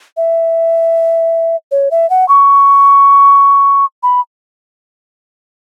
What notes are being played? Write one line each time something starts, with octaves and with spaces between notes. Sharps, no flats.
E5
C#5
E5
F#5
C#6
B5